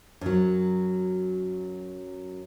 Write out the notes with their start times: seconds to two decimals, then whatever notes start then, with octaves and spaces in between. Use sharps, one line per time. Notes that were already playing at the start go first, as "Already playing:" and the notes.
0.21 F#2 F#3